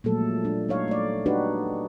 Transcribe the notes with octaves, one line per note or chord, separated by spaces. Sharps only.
A#2 F3 F#3 G#3 A3 A4
G3 D4
F#3 D#4 C#5 F5
A3 D5
D4 D#4 F#4 G4 B4